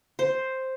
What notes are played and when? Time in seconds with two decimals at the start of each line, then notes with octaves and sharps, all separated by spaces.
0.19 C5